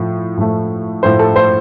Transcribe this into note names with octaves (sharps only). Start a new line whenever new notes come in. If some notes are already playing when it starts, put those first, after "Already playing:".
Already playing: A2 F3 A3
A2 F3 A3
A2 F3 A3 C5
A4
C5